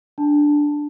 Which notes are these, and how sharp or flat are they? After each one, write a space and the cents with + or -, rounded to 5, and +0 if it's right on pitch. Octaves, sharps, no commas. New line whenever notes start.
D4 +0 A5 +0